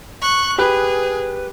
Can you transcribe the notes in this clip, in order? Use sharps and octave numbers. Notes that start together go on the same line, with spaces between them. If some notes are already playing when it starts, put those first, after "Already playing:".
C#6 F#6
G4 G#4 B4 B5 F#6